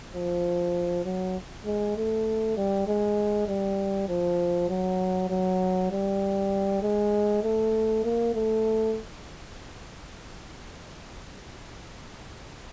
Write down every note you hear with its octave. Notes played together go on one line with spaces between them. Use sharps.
F3
F#3
G#3
A3
G3
G#3
G3
F3
F#3
F#3
G3
G#3
A3
A#3
A3